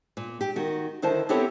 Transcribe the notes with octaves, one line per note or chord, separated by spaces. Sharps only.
A#2
G4
D#3 F#4
D3 D#3 E4 C5 D5 A5
B3 C4 E4 G4 A4 C#5